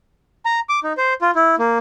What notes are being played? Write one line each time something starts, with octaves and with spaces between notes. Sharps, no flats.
A#5
D6
D#4
C5
F4
E4
A#3